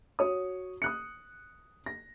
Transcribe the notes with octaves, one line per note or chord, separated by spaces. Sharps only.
F#4 C#5 D#6
D#6 F#6 C#7
A#6